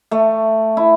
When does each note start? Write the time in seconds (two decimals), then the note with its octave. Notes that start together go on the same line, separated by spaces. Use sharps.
0.11 A3
0.77 E4